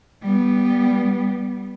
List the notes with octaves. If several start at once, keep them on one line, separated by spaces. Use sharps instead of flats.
G3 B3